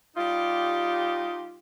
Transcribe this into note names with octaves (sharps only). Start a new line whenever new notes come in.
G3 D#4 F4 G4